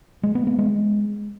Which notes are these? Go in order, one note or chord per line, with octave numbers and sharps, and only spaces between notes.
G#3
B3
B3
G#3